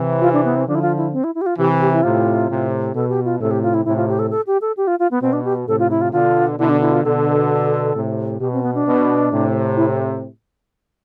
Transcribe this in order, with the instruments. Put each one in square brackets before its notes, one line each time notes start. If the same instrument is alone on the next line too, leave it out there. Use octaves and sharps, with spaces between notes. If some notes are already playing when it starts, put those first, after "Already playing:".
Already playing: [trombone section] C3 E3
[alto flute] F4
D4
B3
C4
[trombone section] D3 F3 [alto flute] D4
[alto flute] E4
F4
E4
C4
E4
E4
G4
F4
[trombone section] C3 E3 [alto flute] G4
[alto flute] G4
E4
[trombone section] A2 C3 [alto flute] F4
[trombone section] A2 C3
[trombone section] B2 [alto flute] A4
[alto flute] G4
F4
[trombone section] A2 C3 [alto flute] A4
[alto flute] G4
F4
E4
[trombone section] A2 C3 [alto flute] E4
[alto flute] F4
G4
A4
A4
G4
A4
G4
F4
F4
B3
[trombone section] B2 [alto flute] C4
[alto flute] D4
G4
[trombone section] A2 C3 [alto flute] A4
[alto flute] F4
E4
F4
[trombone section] B2 D3 [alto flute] F4
[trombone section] B2 D3 [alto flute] E4
[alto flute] D4
E4
F4
[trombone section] B2 D3 [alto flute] A4
[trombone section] A2 C3
[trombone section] B2 [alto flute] G4
[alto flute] C4
B3
D4
[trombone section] B2
A2 C3
[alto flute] E4